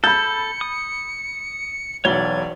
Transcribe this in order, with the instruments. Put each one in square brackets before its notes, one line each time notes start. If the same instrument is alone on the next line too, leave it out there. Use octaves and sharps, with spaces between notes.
[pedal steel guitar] A4 [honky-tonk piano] B5 G6 [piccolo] C#7
[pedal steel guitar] D#6
[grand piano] E1 B1 G7 [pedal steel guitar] C#5 D5 [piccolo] G#6